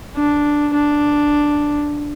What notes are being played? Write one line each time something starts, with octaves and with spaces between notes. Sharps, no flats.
D4
D4